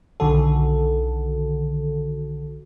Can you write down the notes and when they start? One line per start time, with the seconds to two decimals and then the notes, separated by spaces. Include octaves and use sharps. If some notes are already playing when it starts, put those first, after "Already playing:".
0.20 B1 D3 D#3 F#4 A4